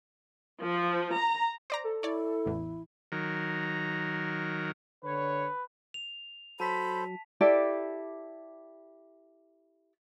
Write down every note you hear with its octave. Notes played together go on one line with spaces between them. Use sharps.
F3
A#5
C5 D5 A#5
A4
E4 C#5 D5
A1 E2
D#3 F#3 A#4
D3 B4 C#5
F7
F#3 A4 C5 A5 B5 B6
E4 G4 A4 D5